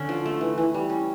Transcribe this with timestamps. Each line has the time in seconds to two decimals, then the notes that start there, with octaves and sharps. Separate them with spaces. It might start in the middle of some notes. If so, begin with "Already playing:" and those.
Already playing: D3 C#4
0.09 F3
0.26 A3
0.41 E3
0.58 E3
0.74 G3
0.90 C#4